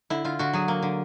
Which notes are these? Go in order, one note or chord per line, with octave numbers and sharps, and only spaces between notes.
D3 E4
D3 F4
D3 F#4
F#3 G#4
A#3
D3